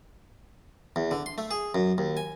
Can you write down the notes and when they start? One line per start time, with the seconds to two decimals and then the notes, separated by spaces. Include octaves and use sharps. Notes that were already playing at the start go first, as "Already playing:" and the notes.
0.96 E2
1.11 D3
1.26 C6
1.38 A3
1.51 G#4
1.75 F#2
1.98 D#2
2.17 G#5